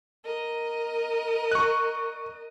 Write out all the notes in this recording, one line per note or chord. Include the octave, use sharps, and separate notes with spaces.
A#4 D#5
C#6 F#6